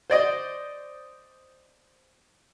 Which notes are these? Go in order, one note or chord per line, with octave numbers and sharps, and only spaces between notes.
C5 D5 D#5